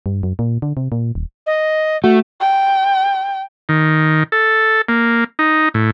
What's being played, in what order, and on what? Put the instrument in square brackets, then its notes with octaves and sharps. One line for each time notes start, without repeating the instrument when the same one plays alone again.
[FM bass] G2
F#2
A#2
D3
C3
A#2
D#1
[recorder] D#5
[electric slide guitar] A3 [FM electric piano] F#4
[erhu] G5
[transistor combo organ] D#3
A4
A#3
D#4
A2